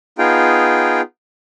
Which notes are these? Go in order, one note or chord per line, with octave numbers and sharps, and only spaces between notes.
B3 D#4 F4 G#4 G5